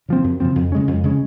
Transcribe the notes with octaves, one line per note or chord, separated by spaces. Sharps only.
C#3 F3 C4
F#2
C#3 F3 C4
F2
C#3 G#3 C#4
F2
C#3 G#3 C#4